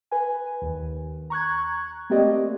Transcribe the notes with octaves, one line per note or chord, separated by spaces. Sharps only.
B4 G#5
D#2
A#5 C#6 F#6 G#6
A3 A#3 C4 G4 D5 D#5